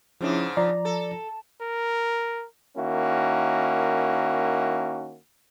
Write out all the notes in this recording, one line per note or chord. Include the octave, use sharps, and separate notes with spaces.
G#2 C#3 F3 C#4 D4 E4
F3 D5 A#5
A4
A#4
D#3 A#3 C#4 E4 F#4